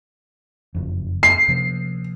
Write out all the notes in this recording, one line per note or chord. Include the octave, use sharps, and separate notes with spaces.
F#1 F2
C7
C3 F3 A#3